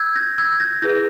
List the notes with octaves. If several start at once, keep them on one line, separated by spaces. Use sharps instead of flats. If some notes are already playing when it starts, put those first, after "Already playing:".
Already playing: E6 G6 G#6
G6 A#6
E6 G#6
G6 A#6
E4 G#4 B4 G6 A#6